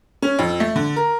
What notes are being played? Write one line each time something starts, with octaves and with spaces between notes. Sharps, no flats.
C#4
F2
A3
D3
A#4